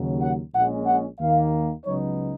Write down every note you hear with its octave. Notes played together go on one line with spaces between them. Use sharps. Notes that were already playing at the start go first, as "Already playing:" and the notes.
Already playing: D#2 C#3 F#3
F#5
A#1 A#2 G#3 C#4 F#5
F#5
D#2 D#3 A#3 F5
C#2 C#3 F#3 B3 D#4 C#5